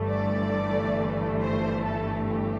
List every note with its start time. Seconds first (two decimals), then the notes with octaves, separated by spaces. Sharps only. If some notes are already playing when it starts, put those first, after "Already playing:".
Already playing: G1 G2 E3 A3
0.09 D5
1.41 C5
1.85 A4
2.29 G4